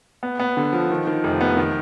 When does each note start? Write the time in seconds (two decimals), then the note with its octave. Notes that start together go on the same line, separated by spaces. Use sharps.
0.23 B3
0.40 B3
0.57 D3
0.73 F3
0.91 D#3
1.07 D#3
1.24 F1
1.41 B3
1.57 D#3